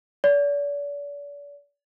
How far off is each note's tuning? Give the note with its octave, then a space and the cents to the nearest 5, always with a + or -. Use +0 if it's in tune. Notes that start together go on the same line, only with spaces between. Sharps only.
D5 -40